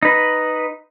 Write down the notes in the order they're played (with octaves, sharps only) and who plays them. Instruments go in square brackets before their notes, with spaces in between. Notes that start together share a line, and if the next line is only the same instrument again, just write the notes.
[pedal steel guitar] D#4 B4